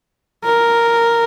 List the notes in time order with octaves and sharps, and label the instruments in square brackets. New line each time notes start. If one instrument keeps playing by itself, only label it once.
[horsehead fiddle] A#4